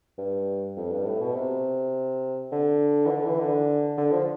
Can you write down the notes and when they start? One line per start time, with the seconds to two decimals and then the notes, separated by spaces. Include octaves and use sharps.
0.18 G2
0.77 F2
0.91 G2
1.06 A2
1.21 B2
1.35 C3
2.52 D3
3.06 E3
3.10 D3
3.25 E3
3.39 D3
3.98 D3
4.12 F3